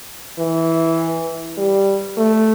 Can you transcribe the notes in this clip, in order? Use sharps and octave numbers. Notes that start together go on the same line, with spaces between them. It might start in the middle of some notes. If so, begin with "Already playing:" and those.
E3
G3
A3